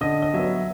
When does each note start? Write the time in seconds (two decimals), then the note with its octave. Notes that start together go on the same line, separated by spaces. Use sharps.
0.01 D3 D#5
0.22 D#5
0.34 F#3 B3 E5